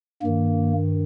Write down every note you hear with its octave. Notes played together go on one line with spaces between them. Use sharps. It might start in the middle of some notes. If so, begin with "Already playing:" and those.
G2 D#3 A#3